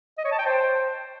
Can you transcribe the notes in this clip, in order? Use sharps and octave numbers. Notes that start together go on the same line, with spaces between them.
D#5
C#5
A5
G5
C5